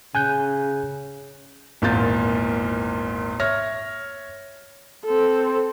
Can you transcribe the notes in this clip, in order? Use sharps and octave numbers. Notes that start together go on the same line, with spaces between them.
C#3 G#5 F#6 G6
G#1 E2 A#2 F4 G6 A6
C#5 E5 F6 A#6
C4 A4